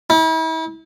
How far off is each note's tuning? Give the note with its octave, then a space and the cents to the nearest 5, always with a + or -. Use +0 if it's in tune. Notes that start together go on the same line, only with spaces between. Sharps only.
E4 -40